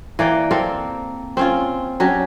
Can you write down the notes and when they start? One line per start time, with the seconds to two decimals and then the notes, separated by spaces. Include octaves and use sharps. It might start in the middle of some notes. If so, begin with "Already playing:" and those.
0.19 E3 A#3 D5 G5
0.51 A#3 C4 A4 A#4
1.37 C4 C#4 F4
2.00 F#3 C#4 D4 G4